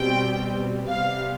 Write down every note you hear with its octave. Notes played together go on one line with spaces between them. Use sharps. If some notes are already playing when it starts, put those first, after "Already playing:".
Already playing: B2 G3 C4 G5
C3 G3 B3 F5